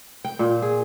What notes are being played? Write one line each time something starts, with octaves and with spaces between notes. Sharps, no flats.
G5
A#2
G#4